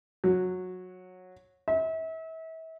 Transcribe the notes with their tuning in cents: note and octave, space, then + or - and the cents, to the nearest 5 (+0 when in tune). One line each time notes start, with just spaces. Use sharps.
F#3 -15
E5 -35